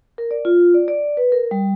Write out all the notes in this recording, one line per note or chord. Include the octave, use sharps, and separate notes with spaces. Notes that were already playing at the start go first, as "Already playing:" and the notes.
A#4
D5
F4
D5
D5
B4
A#4
G3